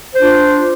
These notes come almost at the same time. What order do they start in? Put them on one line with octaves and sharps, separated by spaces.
C5 D4 F4